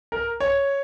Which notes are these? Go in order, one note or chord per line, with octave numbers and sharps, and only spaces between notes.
A#4
C#5